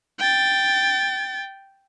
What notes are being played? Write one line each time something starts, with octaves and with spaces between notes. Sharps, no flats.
G5 A6